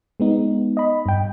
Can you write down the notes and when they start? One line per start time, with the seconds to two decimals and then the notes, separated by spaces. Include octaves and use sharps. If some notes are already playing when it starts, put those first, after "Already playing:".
0.20 G#3 B3 D#4
0.77 D#5 B5
1.06 G2 G5